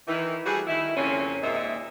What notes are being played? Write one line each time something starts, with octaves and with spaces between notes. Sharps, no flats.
D#3 E3
G3 A3 F#4 G#4
D#3 E4
F2 A#2 C#3 C4 C#4
D#2 A#2 G#3 C4 D#5 E5